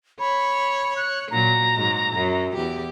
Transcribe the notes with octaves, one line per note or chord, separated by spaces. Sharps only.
C#5 B5
F#6
A#2 F#3 A#5
G#2 F#3
F#2 F#3
E2 G4